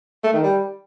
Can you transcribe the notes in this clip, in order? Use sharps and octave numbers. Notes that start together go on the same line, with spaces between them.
A3
D#3
G3